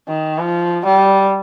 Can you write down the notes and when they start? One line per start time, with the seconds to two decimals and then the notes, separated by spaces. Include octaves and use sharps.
0.08 D#3
0.39 F3
0.85 G3